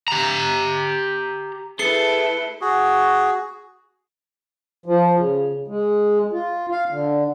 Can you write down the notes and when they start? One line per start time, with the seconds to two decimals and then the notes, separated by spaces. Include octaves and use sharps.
0.08 G4 A#5
1.79 A3 E4 G#4 A4 B4 C7 C#7 G7
2.61 F#4 G#4
4.86 F3
5.17 C#3
5.68 G#3
6.33 F4
6.72 F5
6.90 D3